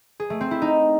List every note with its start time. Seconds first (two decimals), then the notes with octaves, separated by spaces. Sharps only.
0.20 G#4
0.30 A3
0.41 C4
0.51 E4
0.62 D#4